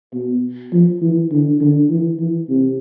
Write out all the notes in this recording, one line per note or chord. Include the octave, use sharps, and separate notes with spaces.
B2
F3
E3
D3
D3
E3
E3
C3